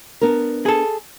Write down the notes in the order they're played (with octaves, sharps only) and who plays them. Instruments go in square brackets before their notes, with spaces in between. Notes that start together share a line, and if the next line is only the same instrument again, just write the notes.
[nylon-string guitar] B3 D4 A#4
[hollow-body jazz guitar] G#4 A4